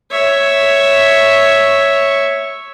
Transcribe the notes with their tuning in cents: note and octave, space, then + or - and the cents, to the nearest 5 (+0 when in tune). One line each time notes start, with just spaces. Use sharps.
C#5 +0 E5 +0